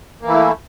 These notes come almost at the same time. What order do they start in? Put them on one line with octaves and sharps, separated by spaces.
A#3 E3 E4 A3